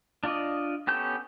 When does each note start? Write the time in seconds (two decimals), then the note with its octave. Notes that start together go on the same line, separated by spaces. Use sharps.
0.24 D4 F4 D5 D#5
0.87 B3 C#4 G4 A4 G6